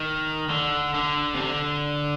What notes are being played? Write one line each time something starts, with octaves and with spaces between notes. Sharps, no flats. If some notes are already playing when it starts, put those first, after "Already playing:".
Already playing: D#3
D3
D3
C3
D3